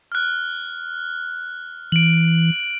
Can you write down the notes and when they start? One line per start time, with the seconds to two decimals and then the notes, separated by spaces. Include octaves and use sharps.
0.12 F6 F#6
1.92 E3 D7 F#7